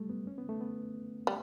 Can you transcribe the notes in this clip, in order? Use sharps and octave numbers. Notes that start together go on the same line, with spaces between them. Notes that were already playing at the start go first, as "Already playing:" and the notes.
Already playing: F#3 G3 A3
B3
C#4
B3
A3
B3
G3